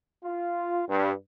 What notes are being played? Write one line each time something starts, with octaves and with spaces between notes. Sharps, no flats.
F4
G2